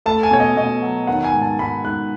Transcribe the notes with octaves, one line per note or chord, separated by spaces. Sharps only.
A3 A5
G#5
B2 C#5
D#5
B2 D#5
F#3
D#3 F#5
G#5
G#2
A5
G#2 B5
G#2 F#6